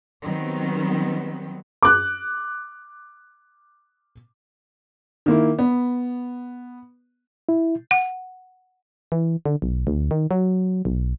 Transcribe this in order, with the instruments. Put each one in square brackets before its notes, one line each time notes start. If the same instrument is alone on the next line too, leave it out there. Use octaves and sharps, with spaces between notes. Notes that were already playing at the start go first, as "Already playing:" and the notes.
[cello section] D#3 F#3 G3 B3 C4
[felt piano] D6 F#6
[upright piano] D#3 A#3 E4
B3
[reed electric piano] E4
[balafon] F#5
[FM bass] E3
D3
B1
D2
D#3
F#3
B1